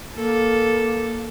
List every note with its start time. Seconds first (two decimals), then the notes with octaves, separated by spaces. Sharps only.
0.16 A#3 A4